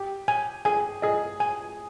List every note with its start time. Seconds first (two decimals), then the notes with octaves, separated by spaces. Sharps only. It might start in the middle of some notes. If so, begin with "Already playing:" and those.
Already playing: G4
0.28 G#5
0.65 G#4 G#5
1.02 G#4 D#5
1.40 G#5